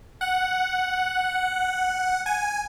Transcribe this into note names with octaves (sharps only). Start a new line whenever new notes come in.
F#5
G#5